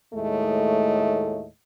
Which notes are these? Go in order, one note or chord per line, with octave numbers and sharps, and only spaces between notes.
D#2 A2 G#3 A3 D#5